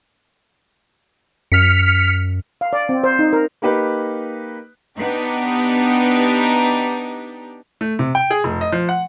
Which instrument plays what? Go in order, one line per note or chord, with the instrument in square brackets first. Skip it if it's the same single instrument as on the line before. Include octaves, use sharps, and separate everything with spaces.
[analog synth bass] F#2 [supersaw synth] F6 B6 C#7
[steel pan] F5
D5
C4
C5
D#4
A#4
[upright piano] A#3 D#4 G4 B4
[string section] B3 D4 D#4 G4
[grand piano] A3
C3
G5
G#4
F1
D#5
F3
F#5